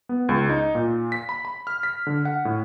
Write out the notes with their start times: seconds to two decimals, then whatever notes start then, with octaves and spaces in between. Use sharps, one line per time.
0.09 B3
0.29 C#2
0.50 D#4
0.75 A#2
1.12 B6
1.29 B5
1.45 B5
1.67 F6
1.83 B6
2.07 D3
2.25 F#5
2.45 A2